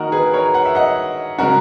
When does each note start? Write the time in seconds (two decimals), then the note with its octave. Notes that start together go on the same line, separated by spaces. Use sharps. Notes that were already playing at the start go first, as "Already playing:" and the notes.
Already playing: D#3 A#3 D#4 F#4 A#4 D#5 F#5
0.12 G#4 B4
0.34 A#4 C#5
0.54 F#5
0.65 E5
0.75 D#5 F#5
1.38 C#3 G#3 C#4 F#4 A#4